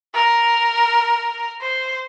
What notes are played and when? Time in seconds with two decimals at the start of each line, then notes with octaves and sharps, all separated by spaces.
0.14 A#4
1.61 C5